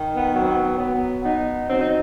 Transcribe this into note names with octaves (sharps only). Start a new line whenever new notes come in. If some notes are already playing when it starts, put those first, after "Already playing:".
Already playing: D#3
B3
F#3
C4
B3
F#3 B3
B3 D#4
F#3 C4
D#4